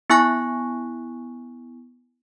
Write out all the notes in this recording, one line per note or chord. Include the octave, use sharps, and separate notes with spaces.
B3 E4 G#5 C#6 F#6 A#6